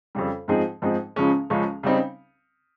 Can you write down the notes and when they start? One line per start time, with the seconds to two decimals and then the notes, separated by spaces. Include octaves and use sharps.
0.15 F2 C#3 G3
0.48 G#2 F3 C4 D#4 G#4
0.82 G#2 F3 C4 D#4 G#4
1.16 C#2 C#3 F3 G#3 C#4
1.50 C#2 C#3 F3 G#3 C#4
1.83 C#3 G3 C4 D#4